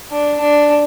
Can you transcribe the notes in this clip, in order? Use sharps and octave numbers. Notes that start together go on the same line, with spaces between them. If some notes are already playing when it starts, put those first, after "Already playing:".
D4
D4